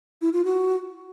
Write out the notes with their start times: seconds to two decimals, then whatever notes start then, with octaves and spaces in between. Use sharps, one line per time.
0.22 E4
0.33 F4
0.44 F#4